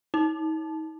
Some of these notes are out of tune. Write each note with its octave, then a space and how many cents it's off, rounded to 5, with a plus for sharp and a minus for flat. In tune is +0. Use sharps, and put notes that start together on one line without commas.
D#4 +40